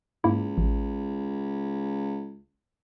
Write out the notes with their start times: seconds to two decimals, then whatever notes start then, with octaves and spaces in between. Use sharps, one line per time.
0.24 C#2 G#2 A#3 E4
0.58 A1